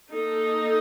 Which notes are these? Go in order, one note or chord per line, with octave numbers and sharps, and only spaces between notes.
A#3 D#4 A4